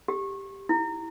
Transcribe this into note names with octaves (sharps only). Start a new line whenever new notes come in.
G4
E4